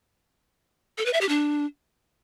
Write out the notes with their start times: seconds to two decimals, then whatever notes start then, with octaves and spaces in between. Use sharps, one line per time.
0.98 A4
1.06 B4
1.13 E5
1.21 G4
1.29 D4